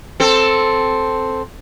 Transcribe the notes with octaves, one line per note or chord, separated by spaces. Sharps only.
C4 A4